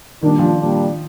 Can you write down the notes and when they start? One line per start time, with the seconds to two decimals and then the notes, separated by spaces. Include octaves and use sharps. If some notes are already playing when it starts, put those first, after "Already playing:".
0.22 A#2 D#3 G3 D4
0.39 F3
0.57 A#2 G3 D4